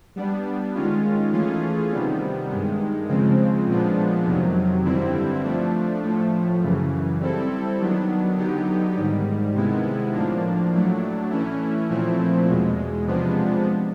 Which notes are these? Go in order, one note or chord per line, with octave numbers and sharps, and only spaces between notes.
G3 B3 D4
D#3 G#3 C#4 F4
E3 A3 C#4 F4 G#4
C3 D#3 G3 B3
G2 D#3 G#3
C#3 F3 G#3 C4
A#2 F3 G#3 B3 D4
F2 C3 D#3 F#3
G2 D3 G3 C4 E4
F3 A3 D4
A2 F3 A3
F#2 C#3 E3
G3 C4 E4 A4
D#3 F#3 B3 D4
D3 F#3 B3 D#4 G4
G#2 D#3 G3
C3 D#3 G#3 B3 E4
A2 F3 A#3 D4
A2 F#3 A3 D4
E3 A3 C#4 E4
A#2 F3 A3 C4 E4
E2 B2 G#3
C3 F3 G#3 B3 D4